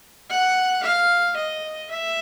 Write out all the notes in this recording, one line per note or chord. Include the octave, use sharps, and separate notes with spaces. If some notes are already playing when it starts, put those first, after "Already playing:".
F#5
F5
D#5
E5